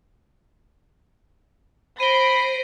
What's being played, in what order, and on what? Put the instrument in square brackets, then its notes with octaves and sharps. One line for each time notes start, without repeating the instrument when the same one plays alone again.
[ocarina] C5 [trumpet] B5 [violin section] A#6 C7 D7 [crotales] D#7 G7